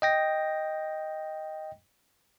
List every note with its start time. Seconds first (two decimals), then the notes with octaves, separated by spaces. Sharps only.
0.02 D#5 G5 A#6